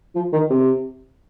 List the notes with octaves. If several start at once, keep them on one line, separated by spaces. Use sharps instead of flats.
F3
D#3
C3